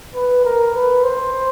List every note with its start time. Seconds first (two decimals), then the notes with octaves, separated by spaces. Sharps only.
0.15 B4
0.44 A#4
0.74 B4
1.04 C5